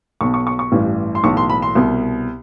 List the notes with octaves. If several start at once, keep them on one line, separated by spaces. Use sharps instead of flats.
B1 B2 C#6
C#6
C#6
C#6
A1 G2 E3
C6
B1 A2 E3 C#6
C6
B5
C6
C2 B2